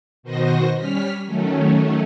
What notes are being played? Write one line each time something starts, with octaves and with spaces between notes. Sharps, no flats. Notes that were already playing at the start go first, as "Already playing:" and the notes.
B2 D#3 F#4 C5 D#5 A#6
G3 C#4 F6 B6
D#3 F#3 A3 C#4